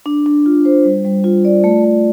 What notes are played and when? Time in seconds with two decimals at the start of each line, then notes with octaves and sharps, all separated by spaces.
0.06 D4
0.26 D4
0.46 F4
0.65 C5
0.85 G3
1.05 G3
1.24 F4
1.45 D5
1.64 A3
1.84 A3